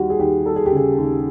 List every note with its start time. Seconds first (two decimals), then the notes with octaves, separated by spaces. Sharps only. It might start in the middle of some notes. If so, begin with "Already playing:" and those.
Already playing: D#2 G3 F#4
0.10 G#4
0.19 D#2 G4
0.46 G3 A4
0.56 G#4
0.66 G4
0.72 C#3 G#4
0.98 D#2